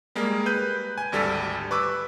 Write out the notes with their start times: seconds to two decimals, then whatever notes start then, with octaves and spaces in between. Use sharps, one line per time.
0.15 G3 G#3 A#3
0.46 B4 G6 D#7
0.98 G#5
1.12 G#1 D2 G3 A4 A6 B6
1.71 B4 C#6 D6 E6